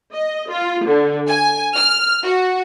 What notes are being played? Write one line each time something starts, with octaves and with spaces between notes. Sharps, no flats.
D#5
F4
D3
G#5
F6
F#4